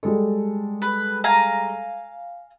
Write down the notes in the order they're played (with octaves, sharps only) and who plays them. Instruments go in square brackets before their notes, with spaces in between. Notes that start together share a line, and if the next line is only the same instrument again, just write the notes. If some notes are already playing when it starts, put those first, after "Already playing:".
[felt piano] G3 G#3 A4
[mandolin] B4
F5 G#5 A#5